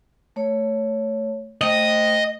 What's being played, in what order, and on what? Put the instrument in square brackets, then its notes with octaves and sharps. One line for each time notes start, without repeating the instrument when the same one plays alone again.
[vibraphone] A3 C#5
[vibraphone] A3 C5 G5 [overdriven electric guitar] D#5